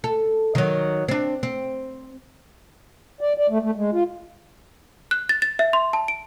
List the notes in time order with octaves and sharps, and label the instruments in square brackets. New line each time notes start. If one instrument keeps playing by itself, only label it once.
[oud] A4
D#3 F#3
C4 D4
C4
[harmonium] D5
D5
A3
A3
G#3
F4
[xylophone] F#6
A6
A6
E5
C6
A5
D7